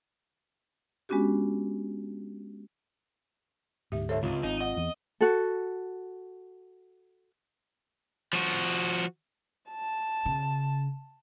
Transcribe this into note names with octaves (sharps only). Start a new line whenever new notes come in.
G#3 B3 C#4 D4 F#4 G4
D1 D2 G#2 G4 E5
A4 C5 C#5 E5
C#2 C3 F4
G#1 C4 D#4
D#5 F#5
E2 E3
F#4 A4
F3 F#4
A5
C#3